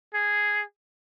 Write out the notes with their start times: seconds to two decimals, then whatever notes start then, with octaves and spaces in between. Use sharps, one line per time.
0.14 G#4